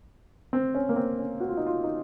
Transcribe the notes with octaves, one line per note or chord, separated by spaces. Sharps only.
C4
C#4
A#3
C4
C#4
F#4
F4
D#4
F4
D#4